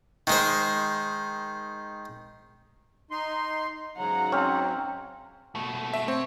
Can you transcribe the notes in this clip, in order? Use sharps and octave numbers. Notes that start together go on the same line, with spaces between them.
D#3 G#3 C5
D#4 C6
G#2 C#3 F#3 F#5 A#5
C4 C#4
B2 A3
E5
C4 C#5